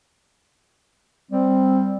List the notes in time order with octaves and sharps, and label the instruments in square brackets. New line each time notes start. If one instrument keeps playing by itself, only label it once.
[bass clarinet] G3 [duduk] C4